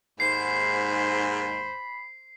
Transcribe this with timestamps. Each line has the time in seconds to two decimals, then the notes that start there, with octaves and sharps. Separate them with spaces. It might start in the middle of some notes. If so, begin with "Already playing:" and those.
0.20 D#2 G#2 C5 B5 C7